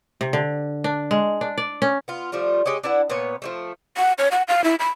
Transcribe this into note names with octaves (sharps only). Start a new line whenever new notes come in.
C3
D3
D4
G#3
D4
D5
C#4
B3 F4
F3 G3 A3 F4
G#3 G4 C#5 D#5
D4 E4 B4 F#5
A#2 B3 B4 C#5
F3 G3 A3
F#5
C#5
F#5
F5
E4
B5